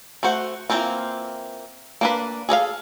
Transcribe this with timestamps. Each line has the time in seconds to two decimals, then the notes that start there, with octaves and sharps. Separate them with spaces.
0.23 A3 F#4 C5 F#5
0.70 E3 F#3 A#3 C4 F4
2.01 A#3 D4 B4
2.49 G#4 A4 D#5 F5